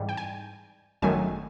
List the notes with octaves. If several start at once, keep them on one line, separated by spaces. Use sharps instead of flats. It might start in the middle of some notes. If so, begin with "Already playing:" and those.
Already playing: G#2 E3 G3 C4
G5
G#5
G#1 F#2 D#3 F#3 A3 G#5